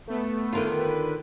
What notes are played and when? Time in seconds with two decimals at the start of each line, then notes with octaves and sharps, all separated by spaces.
0.08 A3 B3
0.53 D3 D#3 F4
0.78 B4